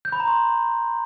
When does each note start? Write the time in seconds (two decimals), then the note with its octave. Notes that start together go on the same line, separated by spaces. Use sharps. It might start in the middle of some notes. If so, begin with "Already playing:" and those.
0.05 G6
0.12 B5
0.20 A#5
0.27 C6